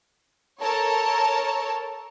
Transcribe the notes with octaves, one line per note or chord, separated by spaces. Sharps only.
A4 A#4 C#5 A5